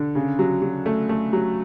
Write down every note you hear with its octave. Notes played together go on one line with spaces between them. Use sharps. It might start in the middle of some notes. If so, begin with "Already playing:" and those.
Already playing: D3
C#3
F#3
F#3
A3
A3
F#3